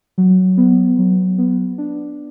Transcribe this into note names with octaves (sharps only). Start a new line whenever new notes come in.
F#3
B3
F#3
B3
D4